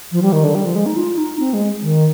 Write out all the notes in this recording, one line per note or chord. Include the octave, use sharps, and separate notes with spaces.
F3
G3
D#3
D3
G3
F3
G#3
D#4
F4
D#4
C4
G#3
D#3